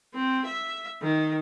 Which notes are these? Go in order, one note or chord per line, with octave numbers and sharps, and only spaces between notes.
C4
E5
D#3